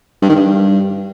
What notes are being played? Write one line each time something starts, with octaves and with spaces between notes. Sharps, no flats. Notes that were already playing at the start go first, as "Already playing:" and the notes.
G2
D#3
G2